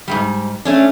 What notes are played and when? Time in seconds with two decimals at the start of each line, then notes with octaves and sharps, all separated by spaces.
0.08 G#2 C3 G3
0.65 A3 C#4 D4